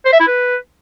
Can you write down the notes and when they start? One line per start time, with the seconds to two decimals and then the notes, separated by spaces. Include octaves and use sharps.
0.05 C5
0.12 E5
0.20 E4
0.27 B4